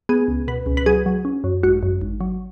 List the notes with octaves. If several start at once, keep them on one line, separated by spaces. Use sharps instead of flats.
B3 G#4
C#2
B2 B4
C#2
B4
F#3 G#4
F#3
C#4
F#2
G#1 F#4
F#2
G#1
F#3